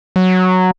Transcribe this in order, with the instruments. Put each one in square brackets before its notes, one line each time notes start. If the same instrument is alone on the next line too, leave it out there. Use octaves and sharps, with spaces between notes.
[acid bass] F#3